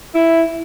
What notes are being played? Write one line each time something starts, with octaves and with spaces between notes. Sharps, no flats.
E4